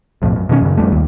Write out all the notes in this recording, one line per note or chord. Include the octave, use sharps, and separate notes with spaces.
B1 F2 A2
F#2
B2 D#3 G3 C#4
F#2 C#3
F2 G3 A3
D#2